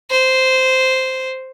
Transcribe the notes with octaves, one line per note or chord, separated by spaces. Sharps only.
C5